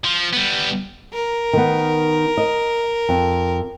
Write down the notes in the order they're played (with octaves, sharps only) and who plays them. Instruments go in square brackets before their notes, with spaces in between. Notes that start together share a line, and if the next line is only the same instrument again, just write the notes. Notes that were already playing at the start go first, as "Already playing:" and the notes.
[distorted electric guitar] F3
G3 B3
[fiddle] A#4
[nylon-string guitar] D#3 B3
D#5
F2